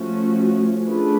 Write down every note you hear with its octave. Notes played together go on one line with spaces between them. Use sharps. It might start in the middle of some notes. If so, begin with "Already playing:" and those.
Already playing: F3 A3 C#4 F#4
A3 D4 F4 G#4 B4